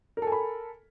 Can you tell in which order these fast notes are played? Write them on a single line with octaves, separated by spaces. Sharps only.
A#4 A4 G#5 B5